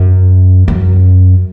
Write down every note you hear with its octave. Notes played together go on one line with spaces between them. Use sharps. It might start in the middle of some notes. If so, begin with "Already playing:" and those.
Already playing: F#2
F#2